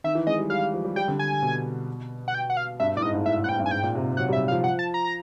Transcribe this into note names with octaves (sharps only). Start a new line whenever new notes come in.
D#3 E5
E3
G#3 D#5
G3
G3 F5
F3
G3
G3 G5
D3
G#5
B2
F#5
G5
F#5
F5
G2 E5
A2 D5
G#2 D#5
G#2
A2 E5
A2
F#5
A2 G5
G2
G#5
G#2 G5
A#2
C3
F#3 F#5
G3 E5
F5
F3
F#5
A5
A#5